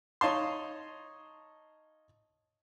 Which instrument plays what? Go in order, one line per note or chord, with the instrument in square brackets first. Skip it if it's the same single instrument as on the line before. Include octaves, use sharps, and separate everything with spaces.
[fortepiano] D#4 C#5 F5 A5 C6